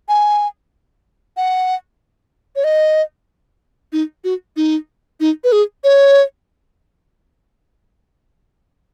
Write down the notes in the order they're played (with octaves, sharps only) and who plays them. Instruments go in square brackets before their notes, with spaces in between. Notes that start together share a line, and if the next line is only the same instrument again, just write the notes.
[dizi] G#5
F#5
C#5
D#5
D#4
F#4
D#4
D#4
B4
G#4
C#5